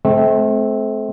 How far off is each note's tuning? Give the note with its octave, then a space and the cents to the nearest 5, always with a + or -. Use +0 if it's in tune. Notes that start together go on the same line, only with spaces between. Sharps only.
A3 -35 C4 +0